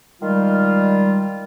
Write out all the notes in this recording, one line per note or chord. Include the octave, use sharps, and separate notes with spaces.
D#3 G3 G#3 F4